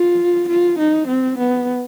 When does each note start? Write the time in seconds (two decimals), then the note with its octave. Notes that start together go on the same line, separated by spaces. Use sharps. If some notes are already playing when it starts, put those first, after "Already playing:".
Already playing: F4
0.48 F4
0.78 D#4
1.08 C4
1.38 B3